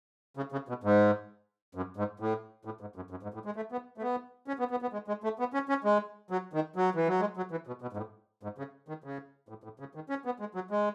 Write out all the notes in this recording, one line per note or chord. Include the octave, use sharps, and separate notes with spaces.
C#3
C#3
B2
G#2
F#2
G#2
A2
A2
G#2
F#2
F#2
G#2
A2
G#3
A3
B3
A3
B3
C#4
B3
B3
B3
G#3
G#3
A3
B3
C#4
C#4
G#3
F#3
D#3
F#3
E3
F#3
G#3
F#3
E3
B2
B2
G#2
A2
G#2
C#3
D#3
C#3
A2
A2
C#3
D#3
C#4
B3
G#3
F#3
G#3